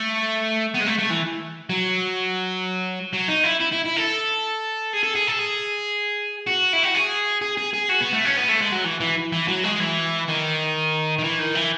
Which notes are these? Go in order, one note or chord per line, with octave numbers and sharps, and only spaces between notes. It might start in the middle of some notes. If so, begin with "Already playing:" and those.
Already playing: A3
B3
G#3
A3
A3
E3
F#3
F#3
D#4
E4
E4
E4
E4
A4
G#4
A4
G#4
A4
G#4
F#4
E4
F#4
G#4
G#4
G#4
G#4
F#4
B3
A3
C#4
B3
A3
G#3
F#3
E3
E3
E3
F#3
G#3
E3
D#3
D#3
E3
D#3
E3